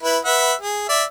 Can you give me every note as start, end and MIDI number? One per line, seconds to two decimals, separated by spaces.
0.03 0.18 64
0.03 0.18 71
0.25 0.53 71
0.25 0.53 76
0.25 0.53 78
0.61 0.86 68
0.89 1.03 74
0.89 1.03 76